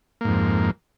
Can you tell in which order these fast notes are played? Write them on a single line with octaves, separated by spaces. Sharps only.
A#3 G#2 F2